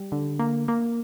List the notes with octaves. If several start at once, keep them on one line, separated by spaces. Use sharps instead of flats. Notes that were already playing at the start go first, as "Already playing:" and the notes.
Already playing: G3
D3
A#3
A#3